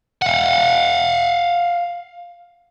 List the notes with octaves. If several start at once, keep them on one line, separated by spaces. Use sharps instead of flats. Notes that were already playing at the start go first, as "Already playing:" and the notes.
F5 F#5